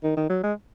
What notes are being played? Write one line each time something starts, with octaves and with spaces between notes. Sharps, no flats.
D#3
D#3
F#3
G#3